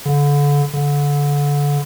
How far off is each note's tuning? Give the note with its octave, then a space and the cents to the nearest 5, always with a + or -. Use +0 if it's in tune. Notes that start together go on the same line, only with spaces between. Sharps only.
D3 -30
D3 -25